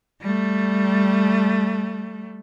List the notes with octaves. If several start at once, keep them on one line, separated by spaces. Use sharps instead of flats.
G3 A3